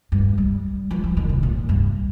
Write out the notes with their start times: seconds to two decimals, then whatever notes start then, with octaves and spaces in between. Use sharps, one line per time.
0.12 G2
0.38 G3
0.91 F3
1.04 F3
1.17 D#3
1.29 C3
1.43 A#2
1.69 G2